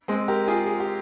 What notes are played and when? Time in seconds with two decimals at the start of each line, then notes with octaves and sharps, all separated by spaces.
0.08 G#3 C4
0.28 G4 A#4
0.48 F4 G#4
0.67 G#4
0.80 G4